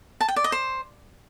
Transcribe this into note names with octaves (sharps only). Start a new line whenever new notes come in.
A5
G5
D5
D#5
C5